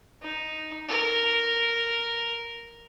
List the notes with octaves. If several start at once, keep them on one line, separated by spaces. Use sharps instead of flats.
D#4
A#4